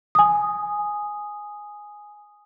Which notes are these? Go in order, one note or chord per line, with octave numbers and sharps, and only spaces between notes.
G#5 D#6